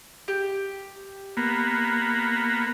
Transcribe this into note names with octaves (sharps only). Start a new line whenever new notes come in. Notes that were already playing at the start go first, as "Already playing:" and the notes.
G4
A#3 B3